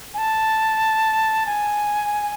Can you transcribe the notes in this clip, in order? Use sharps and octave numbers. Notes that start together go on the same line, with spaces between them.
G#5
A5
G#5